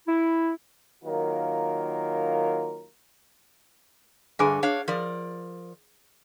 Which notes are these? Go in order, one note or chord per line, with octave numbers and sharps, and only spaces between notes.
E4
D#3 F#3 A#3 F4 A#4
G2 D3 G#4 B4 E5 G#5
D4 C#5 F5
F3 A#4 D5